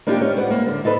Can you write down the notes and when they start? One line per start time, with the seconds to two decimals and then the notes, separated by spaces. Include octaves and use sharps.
0.07 A#3 D4 D#4 F4 G4
0.21 C#4
0.37 B3 D5 F#5
0.50 A#3
0.66 D3
0.85 D#4 A4 B4 D#5